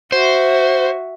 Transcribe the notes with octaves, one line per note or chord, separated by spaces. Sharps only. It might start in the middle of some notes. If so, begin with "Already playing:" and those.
F#4 C5 E5